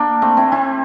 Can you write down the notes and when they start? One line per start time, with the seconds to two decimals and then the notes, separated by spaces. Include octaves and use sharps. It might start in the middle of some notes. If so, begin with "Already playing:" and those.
Already playing: A#3 D4
0.22 A3 C4
0.37 C4 E4
0.52 C4 E4